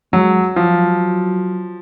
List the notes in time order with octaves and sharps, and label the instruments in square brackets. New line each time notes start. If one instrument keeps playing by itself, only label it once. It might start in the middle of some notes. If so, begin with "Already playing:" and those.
[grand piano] F#3 [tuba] G#3
[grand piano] F3 [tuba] F#3